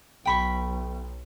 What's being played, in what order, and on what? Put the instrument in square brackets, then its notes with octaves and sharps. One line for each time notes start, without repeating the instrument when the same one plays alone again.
[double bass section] B1 [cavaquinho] G5 B5 C#6